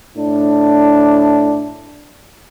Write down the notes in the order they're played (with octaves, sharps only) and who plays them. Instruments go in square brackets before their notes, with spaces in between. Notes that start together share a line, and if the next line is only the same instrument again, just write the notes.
[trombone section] A2 D4